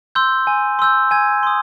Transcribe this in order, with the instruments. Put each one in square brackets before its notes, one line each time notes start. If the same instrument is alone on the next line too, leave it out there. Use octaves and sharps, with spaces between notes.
[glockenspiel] C6 E6 G6
G#5
C6 E6 G6
G#5 G#6
C6 D#6